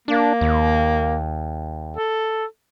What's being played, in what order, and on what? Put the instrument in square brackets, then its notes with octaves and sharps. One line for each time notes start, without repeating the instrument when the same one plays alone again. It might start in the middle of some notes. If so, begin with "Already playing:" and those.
[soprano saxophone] A#3 [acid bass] D4
[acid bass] D#2
[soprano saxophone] A4